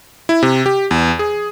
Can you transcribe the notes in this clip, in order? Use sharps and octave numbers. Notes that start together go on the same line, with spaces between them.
E4
C3
G4
E2
G#4